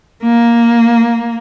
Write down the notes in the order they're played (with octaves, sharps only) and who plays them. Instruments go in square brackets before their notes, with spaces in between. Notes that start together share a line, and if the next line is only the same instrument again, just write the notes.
[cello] A#3